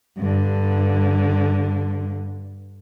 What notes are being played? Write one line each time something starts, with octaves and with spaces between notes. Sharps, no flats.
G2 D3